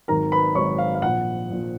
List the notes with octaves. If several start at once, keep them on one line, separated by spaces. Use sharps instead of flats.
G#1 G#2 D#3 F#3 A#4 A#5
B4 B5
G#1 G#2 D#3 F#3 C#5 C#6
F5
F5
A#1 A#2 F3 F#5
A#1 A#2 F3